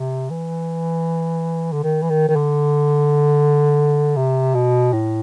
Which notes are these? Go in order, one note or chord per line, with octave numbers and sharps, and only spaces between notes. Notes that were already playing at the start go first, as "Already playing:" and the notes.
Already playing: C3
E3
D3
D#3
E3
D#3
D#3
D3
C3
B2
A2